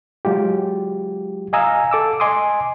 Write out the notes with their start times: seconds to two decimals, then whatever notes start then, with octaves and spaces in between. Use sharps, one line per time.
0.25 F#3 G#3 F4 G4
1.53 D#5 F5 G#5 A#5 D#6 E6
1.91 A4 D6 E6
2.20 D#5 G#5 C6 D6 D#6